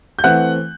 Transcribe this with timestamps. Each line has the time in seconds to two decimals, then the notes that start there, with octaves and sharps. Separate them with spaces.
0.19 G6
0.24 E3 A3 C4 F#5 F#6